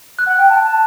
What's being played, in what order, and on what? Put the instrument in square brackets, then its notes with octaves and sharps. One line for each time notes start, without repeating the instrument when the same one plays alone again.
[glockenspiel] F#6
[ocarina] F#5
G5
A5
A5